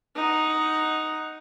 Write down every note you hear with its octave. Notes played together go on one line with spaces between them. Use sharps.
D#4 F#5